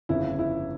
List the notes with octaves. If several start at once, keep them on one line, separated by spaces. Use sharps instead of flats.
G1 F2 C#3 E4
E4